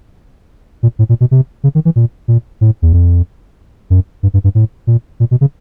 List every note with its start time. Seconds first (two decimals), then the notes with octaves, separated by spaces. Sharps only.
0.83 A#2
0.99 A2
1.09 A#2
1.21 B2
1.31 C3
1.64 C#3
1.75 D#3
1.85 E3
1.96 A#2
2.28 A#2
2.61 A2
2.82 E2
2.93 F2
3.90 F#2
4.23 G2
4.34 G2
4.44 G2
4.55 A2
4.87 A#2
5.20 A#2
5.31 B2
5.41 C#3